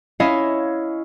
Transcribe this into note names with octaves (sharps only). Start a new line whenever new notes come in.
C#4 E4 C#5 D#5 F5